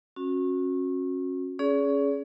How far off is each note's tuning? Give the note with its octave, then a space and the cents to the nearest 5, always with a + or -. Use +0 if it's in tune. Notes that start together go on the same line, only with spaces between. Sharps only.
C#4 -30 F#4 -20
C#4 +5 G#4 +20 D5 -45